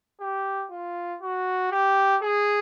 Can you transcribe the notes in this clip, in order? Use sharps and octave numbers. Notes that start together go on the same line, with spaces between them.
G4
F4
F#4
G4
G#4